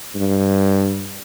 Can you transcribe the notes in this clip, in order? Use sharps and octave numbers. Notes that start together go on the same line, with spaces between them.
G2